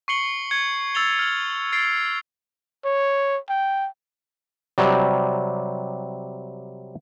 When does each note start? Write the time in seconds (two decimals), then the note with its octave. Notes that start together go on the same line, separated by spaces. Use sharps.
0.08 C#6 C7 C#7 F#7 G7
0.51 G#6 C#7
0.95 E6 A6 F7 G7
1.19 F6
1.73 A6 C7 D7
2.85 C#5
3.49 G5
4.78 C3 F#3 G3